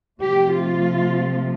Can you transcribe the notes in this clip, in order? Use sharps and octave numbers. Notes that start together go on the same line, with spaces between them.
C3 F3 A3 G4
F4